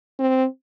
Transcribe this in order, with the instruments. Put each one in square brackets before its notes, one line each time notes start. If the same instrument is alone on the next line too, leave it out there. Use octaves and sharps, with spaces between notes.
[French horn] C4